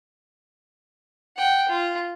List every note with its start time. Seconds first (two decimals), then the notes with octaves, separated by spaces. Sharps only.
1.37 F#5 G5
1.69 F4